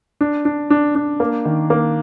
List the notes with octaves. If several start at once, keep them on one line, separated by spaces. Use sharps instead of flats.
D4
D4
D4
D4
A#3
D#3
A#3